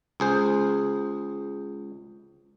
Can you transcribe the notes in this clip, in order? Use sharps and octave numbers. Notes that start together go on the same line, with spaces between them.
C#2 G#4 C5